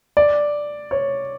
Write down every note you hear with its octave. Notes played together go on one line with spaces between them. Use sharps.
D5
C#5